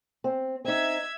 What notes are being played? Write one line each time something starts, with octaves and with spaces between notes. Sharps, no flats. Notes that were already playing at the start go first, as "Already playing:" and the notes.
C4
C4 D#4 E5 G#6